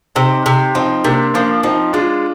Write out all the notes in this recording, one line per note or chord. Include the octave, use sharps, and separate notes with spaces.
C3 C4 D#4
C3
F3 C4 D#4
C3 A#3 D4
F3 A#3 D4
F3 C4 D#4
G#3 D4 F4